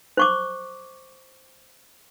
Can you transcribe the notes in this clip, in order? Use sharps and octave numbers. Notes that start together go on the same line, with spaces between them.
C5 C#6 D6